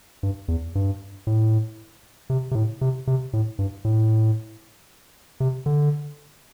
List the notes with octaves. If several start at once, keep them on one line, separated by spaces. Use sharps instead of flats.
G2
E2
G2
A2
C3
C3
A2
C3
C3
A2
G2
A2
C3
D3